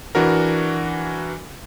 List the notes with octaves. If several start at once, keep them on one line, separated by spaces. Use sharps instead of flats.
E3 D4 F#4 A#4